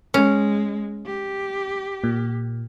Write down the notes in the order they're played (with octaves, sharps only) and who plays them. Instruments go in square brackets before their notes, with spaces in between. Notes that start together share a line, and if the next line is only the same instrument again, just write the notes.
[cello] G#3 [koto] C#4
[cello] G4
[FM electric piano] A#2